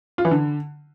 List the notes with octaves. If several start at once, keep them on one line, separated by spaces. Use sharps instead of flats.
F4
E3
D3